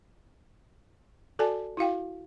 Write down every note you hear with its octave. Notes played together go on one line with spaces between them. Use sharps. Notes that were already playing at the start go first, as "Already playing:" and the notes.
F#4 A4 D5 G#5 A5
E4 F#4 F5 G5